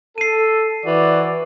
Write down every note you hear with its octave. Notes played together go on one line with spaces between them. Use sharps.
A4 C7 D#7
E3 F#4 C5 D5